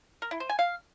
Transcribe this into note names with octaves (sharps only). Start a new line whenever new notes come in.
A#4
E4
C5
G#5
F5